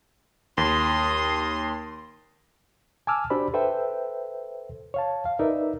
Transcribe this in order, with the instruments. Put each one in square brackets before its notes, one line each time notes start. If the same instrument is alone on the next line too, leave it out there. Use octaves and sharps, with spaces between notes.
[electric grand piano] D#2 [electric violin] C6 D#6
[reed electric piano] G#5 A5 D6 E6 F6
D4 F#4 G4 C5 D5 B5
A4 B4 C5 E5 G5
C#5 F5 A5
F5
D#4 A#4 B4 D5 E5